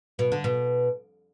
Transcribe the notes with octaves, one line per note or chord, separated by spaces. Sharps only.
B2
D3
B2